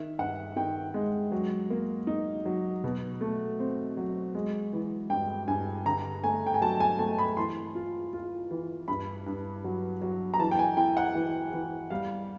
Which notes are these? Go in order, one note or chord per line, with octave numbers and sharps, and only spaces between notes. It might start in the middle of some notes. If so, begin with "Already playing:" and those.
Already playing: D#3 E5
G2 F#5
D#3 G5
G#3
F#3
A#3
D#4
F#3
B2
A3
C4
F#3
G#3
E3
G2 G5
G2 G#5
D3 A#5
A3 G#5
G5
G#5
F#3 A5
G#5
A3 A5
B5
E3 C6
F4
F4
E3
G2 B5
G2
F#3
F#3
A#5
E3 A5
G5
G#5
E4 G5
F#5
E3
E3
G3 F5